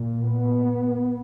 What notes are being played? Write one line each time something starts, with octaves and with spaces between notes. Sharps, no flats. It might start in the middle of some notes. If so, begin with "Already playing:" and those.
Already playing: A#2
B3